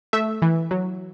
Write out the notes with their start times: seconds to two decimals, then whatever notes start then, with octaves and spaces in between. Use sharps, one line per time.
0.13 A3 E5
0.42 E3
0.71 F#3